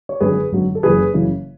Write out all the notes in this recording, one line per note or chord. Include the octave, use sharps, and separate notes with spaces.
C#5
G#1 F#2 D3 F#3 G#4 B4
G#1 F#2 D3 F#3
A4
F#1 F#2 C#3 E3 G#4 B4
F#1 F#2 C#3 E3